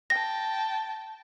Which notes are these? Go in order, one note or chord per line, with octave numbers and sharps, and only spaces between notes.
G5 A5 A#6